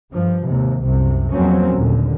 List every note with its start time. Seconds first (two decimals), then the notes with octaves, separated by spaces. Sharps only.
0.11 G2 F3
0.45 D#2 G#2 C3
0.83 C2 F#2 C3
1.31 E2 F3 F#3 A#3 C4 C#4
1.73 G1 D#2 A#2 D3